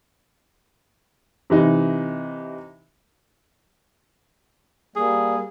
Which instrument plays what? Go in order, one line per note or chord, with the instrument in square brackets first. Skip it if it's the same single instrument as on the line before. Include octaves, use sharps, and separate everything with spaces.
[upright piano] C3 E3 D#4
[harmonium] G3 A#3 [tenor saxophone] G#4